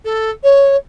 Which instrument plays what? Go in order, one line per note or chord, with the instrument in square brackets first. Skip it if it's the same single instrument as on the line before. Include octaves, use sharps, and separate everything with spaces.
[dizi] A4
C#5